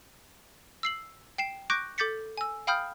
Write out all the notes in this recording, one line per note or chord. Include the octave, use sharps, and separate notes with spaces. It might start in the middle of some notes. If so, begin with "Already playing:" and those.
E6 C7 F#7
G5 C7 E7
C#6 D6 F#6 G6 A#6 D7
A4 D6 G6 A6 B6 C#7
G#5 E6
F5 G5 B5 D#6 F6 G6